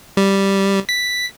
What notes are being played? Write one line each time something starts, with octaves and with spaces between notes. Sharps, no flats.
G3
B6